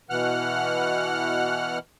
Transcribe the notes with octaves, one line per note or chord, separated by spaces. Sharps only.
B2 E3 F#5 F6 F#6